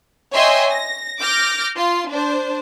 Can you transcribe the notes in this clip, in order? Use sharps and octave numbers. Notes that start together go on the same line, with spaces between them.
C#5 D#5 E5 G5 G#5 C6
A#6
D6 F6 G6 A#6
F4 C6
D4 C5